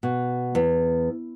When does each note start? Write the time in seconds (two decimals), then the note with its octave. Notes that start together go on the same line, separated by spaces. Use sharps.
0.03 B2
0.55 E2